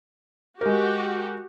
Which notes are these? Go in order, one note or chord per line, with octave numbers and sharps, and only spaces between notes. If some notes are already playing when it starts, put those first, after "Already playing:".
G#3 F#4 G4 A#4